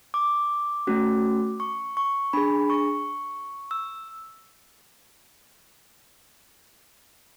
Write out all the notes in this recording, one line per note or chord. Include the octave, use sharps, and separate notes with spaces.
D6
A3 C#4 F#4
C#6
C#6
D4 G#4 B5
C#6
E6